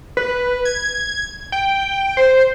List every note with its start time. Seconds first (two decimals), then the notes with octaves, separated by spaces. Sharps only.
0.17 B4
0.65 G#6
1.52 G5
2.17 C5